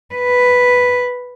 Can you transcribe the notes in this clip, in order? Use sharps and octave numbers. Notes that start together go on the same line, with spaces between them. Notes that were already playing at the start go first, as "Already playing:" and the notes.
B4